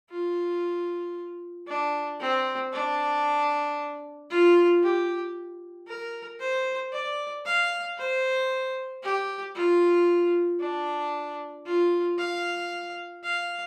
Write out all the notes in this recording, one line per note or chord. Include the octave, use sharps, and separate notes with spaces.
F4
D4
C4
D4
F4
G4
A#4
C5
D5
F5
C5
G4
F4
D4
F4
F5
F5